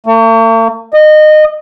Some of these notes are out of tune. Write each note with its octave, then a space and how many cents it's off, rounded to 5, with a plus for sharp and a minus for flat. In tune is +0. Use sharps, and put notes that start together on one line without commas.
A3 +45
D#5 -25